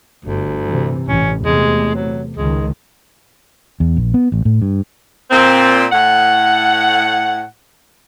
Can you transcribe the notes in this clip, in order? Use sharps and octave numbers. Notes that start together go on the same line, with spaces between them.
G1 D2
C3 E3
A1 C#4
E2 C3 G#3 A3
F#3
C#2 D#3 G#3
E2
A#1
B3
A1
A2
G2
A#2 C4
A2 F#5